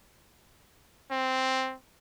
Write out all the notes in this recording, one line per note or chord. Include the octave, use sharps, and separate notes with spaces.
C4